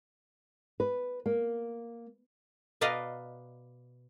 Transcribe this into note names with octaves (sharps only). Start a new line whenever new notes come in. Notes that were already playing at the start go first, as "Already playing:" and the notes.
B4
A#3
B2 B4 D5 D#5 F5 A#5